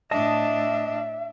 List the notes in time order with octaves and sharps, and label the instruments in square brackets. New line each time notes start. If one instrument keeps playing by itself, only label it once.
[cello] A2 D4 [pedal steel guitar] D#5 A5 D#6 [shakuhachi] E5